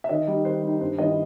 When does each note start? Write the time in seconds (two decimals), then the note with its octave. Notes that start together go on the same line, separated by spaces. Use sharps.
0.04 E5
0.09 D#3 D#5
0.27 G3 D#4
0.45 D#3 C5
0.62 G3 D#4
0.80 G2 C5
0.98 D#3 G3 B3 E4 D#5